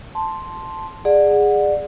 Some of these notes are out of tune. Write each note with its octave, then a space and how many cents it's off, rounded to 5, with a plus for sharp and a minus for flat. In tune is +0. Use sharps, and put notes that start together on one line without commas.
A5 +0 C6 +0
G#4 -15 D5 +15 F#5 -15